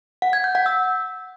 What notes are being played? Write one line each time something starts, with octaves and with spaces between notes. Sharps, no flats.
F#5
G#6
G6
F#5
E6